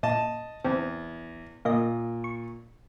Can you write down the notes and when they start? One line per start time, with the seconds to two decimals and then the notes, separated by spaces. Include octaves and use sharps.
0.03 A#2 D#5 A5
0.64 E2 C4
1.65 A#2 A#3 D#5
2.24 C#6